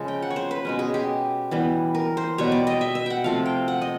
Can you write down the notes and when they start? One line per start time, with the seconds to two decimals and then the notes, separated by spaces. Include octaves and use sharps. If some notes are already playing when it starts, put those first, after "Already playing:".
Already playing: C#3 F3 G#3
0.08 G5
0.22 F#5
0.30 C#5
0.36 C5
0.51 B4
0.65 B2 G#3 C#4
0.79 G#4
0.94 G4
1.51 E3 G3 B3
1.95 A#4
2.17 C5
2.38 B2 G3 B3 C#5
2.52 D5
2.67 D#5
2.81 E5
2.95 E5
3.06 F#5 G5
3.24 C3 F3 A3 C4 F5
3.46 G5
3.68 F#5
3.82 D#5